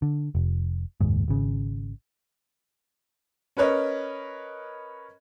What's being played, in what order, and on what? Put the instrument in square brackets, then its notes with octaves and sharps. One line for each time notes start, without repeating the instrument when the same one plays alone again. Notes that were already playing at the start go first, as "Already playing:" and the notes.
[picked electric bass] D3
F1
F#1 D#2 G#2
G#1 C#3
[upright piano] C#4 A#4 B4 C#5 D#5